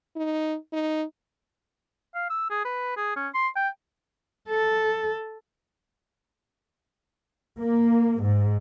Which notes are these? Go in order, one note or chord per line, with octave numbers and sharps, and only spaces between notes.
D#4
D#4
F5
E6
G#4
B4
G#4
C#4
C6
G5
A4
A#3
G#2